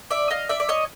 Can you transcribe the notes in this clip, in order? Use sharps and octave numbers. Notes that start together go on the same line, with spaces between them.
D5 E5
D#5 F5
D5 E5
D5
C#5 D#5